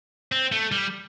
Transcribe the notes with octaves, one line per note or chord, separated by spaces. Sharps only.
C4
A3
G3